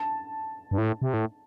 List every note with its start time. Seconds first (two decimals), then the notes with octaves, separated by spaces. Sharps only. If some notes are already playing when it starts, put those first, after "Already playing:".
Already playing: A5
0.71 G2
0.78 A2
1.02 C3
1.14 A2